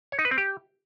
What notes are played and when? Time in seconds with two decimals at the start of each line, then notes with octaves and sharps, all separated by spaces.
0.12 C#5
0.19 D#4
0.25 B4
0.31 C4
0.38 G4